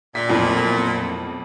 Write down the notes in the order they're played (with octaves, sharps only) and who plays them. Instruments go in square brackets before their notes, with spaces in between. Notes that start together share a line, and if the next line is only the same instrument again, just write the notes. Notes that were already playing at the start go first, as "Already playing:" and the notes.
[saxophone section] A#2 [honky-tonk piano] B6
[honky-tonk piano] B1 F2 A2